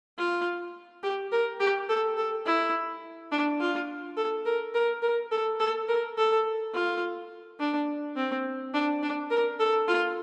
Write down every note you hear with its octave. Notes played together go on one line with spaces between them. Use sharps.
F4
G4
A#4
G4
A4
A4
E4
D4
F4
A4
A#4
A#4
A#4
A4
A4
A#4
A4
F4
D4
C4
D4
D4
A#4
A4
F4